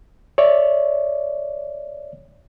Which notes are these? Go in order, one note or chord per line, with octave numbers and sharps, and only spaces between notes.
C#5 D5 E5